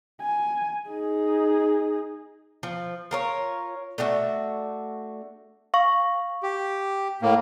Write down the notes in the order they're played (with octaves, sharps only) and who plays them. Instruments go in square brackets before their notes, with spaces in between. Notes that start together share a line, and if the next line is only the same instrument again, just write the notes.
[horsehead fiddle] G#5
D#4 G#4
[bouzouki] F3
F4 A#4 C#5
A3 D4 F#4 E5
[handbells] F5 C#6
[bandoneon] G4
A2 A#3